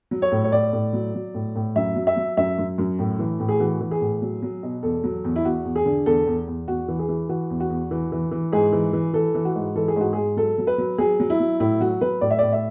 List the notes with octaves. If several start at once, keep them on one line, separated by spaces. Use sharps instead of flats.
F#3
C#5
A2
C#5
A2 D5
A2
F#3
F#3
A2
A2
F#2 E5
F#3
E5
F#3
F#2 E5
F#2
F#2
A2
E3
A2
G#4
E3 F#4
E3
G#4
A2
F#3
F#3
B2
E2 A4
F#3
E2
E4
E2 F#4
E2
G#4
D3
E2 A4
E2
E2
E2 F#4
E3
G#4
E3
E3 F#4
E2
F#4
E2
E3
E3
E3
G#2 G#4
E3
E3
E3 A4
E3
F#4
G#2
E3 A4
G#4
G#2 F#4
G#2 G#4
F#3 A4
F#3
B4
F#3
F#3 G#4
F#3
E4
F#3
A2 E4
F#3 F#4
F#3 B4
A2 D5
E5
A2 D5
E5